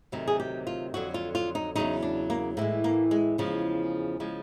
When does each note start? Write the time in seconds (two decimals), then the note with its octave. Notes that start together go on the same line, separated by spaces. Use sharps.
0.12 D2 C3 D#3 F#3
0.28 G#4
0.40 G4
0.67 F4
0.94 F2 D3 F#3 F#4
1.14 F4
1.35 F4
1.55 D#4
1.75 E2 C#3 F#3 D#4
2.02 D4
2.30 A#3
2.57 A2 E3 G#3 A#3
2.84 A#3
3.11 G#3
3.38 E2 C#3 F3 G#3
4.20 C#3 F3 G#3